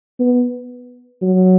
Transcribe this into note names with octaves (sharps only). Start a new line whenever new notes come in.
B3
F#3